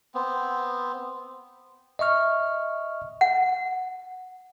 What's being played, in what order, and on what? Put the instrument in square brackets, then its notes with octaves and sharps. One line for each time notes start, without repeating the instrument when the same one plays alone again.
[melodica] B3 C4
[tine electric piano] D#5 E5 C#6 F6
[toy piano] F#5